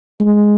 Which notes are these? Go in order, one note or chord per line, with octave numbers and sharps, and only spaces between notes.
G#3